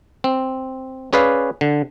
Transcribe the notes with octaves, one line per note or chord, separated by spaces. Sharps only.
C4
C#4 G#4 B4 D5 F5
D3